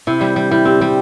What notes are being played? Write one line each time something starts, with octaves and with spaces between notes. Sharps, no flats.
C3 E4
G3
G3
G3 E4
C4 G4
G3 G4